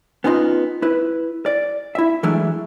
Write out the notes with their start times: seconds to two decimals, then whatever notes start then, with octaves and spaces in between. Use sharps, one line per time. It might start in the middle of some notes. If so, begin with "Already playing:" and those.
0.24 B3 C#4 D#4 F4 D#5
0.82 E4 B4
1.46 D5
1.95 E4 E5
2.23 E3 F#3 G#3 A3 D4 E4